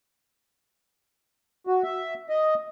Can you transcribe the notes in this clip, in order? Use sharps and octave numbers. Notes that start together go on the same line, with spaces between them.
F#4
E5
D#5